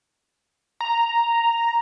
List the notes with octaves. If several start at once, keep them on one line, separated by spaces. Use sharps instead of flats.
A#5